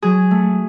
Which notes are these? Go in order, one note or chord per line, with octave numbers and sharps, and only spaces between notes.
F#3 G#4
A3